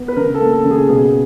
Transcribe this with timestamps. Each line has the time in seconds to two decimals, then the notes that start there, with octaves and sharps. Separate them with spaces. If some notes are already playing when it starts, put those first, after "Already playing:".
Already playing: B3
0.08 B4
0.16 C#3 A#4
0.34 A4
0.40 A#3
0.52 A4
0.65 C#3
0.71 G#4
0.89 B2 G#4